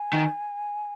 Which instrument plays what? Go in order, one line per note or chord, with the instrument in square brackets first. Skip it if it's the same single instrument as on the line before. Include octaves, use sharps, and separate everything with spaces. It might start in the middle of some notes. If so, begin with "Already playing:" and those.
Already playing: [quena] G#5
[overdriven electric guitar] D#3